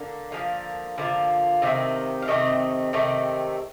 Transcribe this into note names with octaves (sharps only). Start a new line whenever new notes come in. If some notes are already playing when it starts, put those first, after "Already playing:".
Already playing: D3 A#3
D3 F3 A#3 F5
D3 F3 A#3
C3 D#3 A3 C4
F5
C3 D#3 A3 C4 D#5
C3 D#3 A3 C4